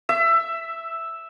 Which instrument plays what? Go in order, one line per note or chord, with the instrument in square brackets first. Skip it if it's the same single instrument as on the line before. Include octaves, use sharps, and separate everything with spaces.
[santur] E5